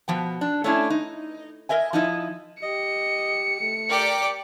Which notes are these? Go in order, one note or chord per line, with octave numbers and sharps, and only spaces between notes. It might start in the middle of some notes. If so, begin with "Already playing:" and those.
B2 F3 G5
D4
A3 C#4 D4 E4
D#4
A#4 D#5 E5 G#5
F3 D#4 E4 D#5
G4 D#5 C#7
A3
G4 A#4 D5 D6